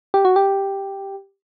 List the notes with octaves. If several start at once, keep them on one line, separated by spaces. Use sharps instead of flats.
G4
F#4
G4